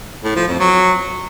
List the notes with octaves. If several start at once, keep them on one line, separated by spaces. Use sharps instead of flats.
A2
F3
F2
F#3